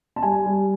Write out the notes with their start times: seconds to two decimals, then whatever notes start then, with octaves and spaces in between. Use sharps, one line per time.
0.16 A5
0.23 G3 G#5
0.46 G3